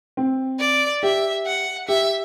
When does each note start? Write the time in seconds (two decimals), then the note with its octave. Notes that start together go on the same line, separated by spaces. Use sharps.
0.17 C4
0.60 D5
1.03 G4 E5
1.46 F#5
1.88 G4 E5